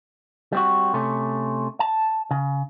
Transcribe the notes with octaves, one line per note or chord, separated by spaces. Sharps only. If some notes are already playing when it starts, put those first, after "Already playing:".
G3 C4 F#4
C3 A3 C#4
A5
C#3